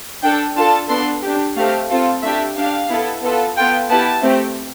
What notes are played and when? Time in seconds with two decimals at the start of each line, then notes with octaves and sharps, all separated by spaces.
0.23 D4 A4 G5
0.56 D4 F4 A4 A5
0.90 B3 D4 A4 C6
1.23 D4 G4
1.56 A3 C4 G4 F5
1.90 C4 F4 A4
2.23 A3 D4 G4 E5
2.56 D4 G4 F5
2.90 B3 E4 A4
3.23 B3 F4 A4
3.56 B3 F4 A4 G5
3.89 B3 E4 G4 A5
4.22 A3 C4 G4